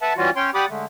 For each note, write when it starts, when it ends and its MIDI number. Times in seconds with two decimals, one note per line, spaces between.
0.01 0.13 71
0.01 0.13 76
0.01 0.13 78
0.01 0.13 81
0.17 0.31 52
0.17 0.31 55
0.17 0.31 61
0.17 0.31 65
0.17 0.31 66
0.36 0.50 61
0.36 0.50 73
0.36 0.50 79
0.36 0.50 84
0.54 0.66 67
0.54 0.66 74
0.54 0.66 78
0.54 0.66 83
0.54 0.66 86
0.54 0.66 87
0.69 0.86 50
0.69 0.86 56
0.69 0.86 57